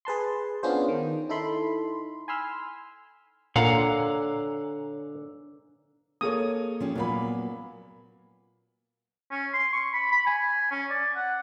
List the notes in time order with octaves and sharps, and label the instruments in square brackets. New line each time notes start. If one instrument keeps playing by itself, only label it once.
[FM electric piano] G#4 B4 A5 C6
B3 C#4 D4 F4 G#4 C5
D#3
D#4 E4 A4 B5 C6
G#5 B5 C6 E6 F6
[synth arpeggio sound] A#2 [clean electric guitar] D3 [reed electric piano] C#5 G#5 A#5 [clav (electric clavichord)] F5 F#5
[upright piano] A#3 A4 C#5 [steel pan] G#4 D#6
[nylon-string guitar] F3 C#4 G4
[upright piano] A#2 B5 [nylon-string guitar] F#3 A#3 B3
[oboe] C#4
C6
C#6
B5
B5
G#5
C#4
D5
F#5